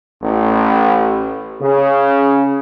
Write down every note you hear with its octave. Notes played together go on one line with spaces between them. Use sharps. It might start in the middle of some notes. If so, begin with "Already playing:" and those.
A1
C#3